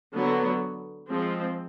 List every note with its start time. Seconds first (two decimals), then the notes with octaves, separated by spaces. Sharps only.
0.13 D3 F#3 B3
1.08 F3 G#3 C4